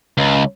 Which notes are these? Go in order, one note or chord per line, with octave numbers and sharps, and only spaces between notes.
C#2